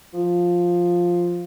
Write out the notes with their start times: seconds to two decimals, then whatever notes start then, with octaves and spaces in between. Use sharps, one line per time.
0.13 F3